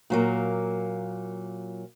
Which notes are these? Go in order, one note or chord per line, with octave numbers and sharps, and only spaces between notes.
A#2 F#3 A#3